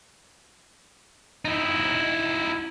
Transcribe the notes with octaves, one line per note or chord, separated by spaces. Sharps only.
D#4 E4